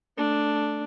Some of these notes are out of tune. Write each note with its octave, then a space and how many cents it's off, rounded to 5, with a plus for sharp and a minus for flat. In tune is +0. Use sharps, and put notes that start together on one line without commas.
A3 +0 D4 +0